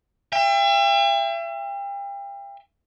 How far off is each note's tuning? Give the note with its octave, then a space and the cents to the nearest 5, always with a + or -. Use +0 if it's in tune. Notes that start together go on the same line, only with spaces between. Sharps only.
E5 +40 G5 +35